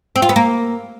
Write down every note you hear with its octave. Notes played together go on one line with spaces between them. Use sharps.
C4
F4
B3
A#3